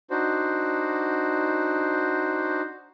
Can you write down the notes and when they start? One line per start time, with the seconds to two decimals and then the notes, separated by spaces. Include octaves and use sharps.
0.10 D4 D#4 F#4 C5